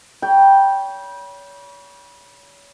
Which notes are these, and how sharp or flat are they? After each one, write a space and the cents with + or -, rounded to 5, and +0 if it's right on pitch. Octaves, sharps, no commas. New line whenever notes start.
C#5 +35 G5 +0 B5 -30